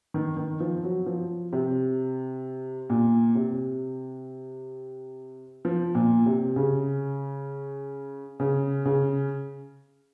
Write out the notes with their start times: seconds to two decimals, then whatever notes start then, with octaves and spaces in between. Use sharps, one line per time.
0.14 D#3
0.37 D#3
0.60 F3
0.83 F#3
1.06 F3
1.53 C3
2.90 A#2
3.35 C3
5.65 F3
5.95 A#2
6.26 C3
6.56 C#3
8.40 C#3
8.85 C#3